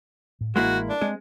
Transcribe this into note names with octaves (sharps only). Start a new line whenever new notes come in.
A2
A1 G#3 A#3 E4 F#4
D4
G#3 C4